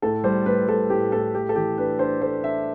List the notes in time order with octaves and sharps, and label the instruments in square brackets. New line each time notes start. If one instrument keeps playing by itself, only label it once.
[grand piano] A2 A4
G3 C5
A2 B4
G3 A4
A2 G4
A2 A4
A3 G4
A4
E3 G4
D4 B4
D4 C5
A3 C5
D4 E5